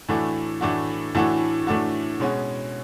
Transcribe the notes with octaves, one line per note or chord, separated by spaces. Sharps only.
A2 E3 A3 D4 F#4
A2 E3 A3 D4 F#4
A2 E3 A3 D4 F#4
A2 E3 A3 D4 F#4
B2 G#3 C#4 F#4